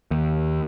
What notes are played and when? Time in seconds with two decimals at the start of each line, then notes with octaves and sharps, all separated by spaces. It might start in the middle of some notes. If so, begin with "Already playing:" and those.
0.11 D#2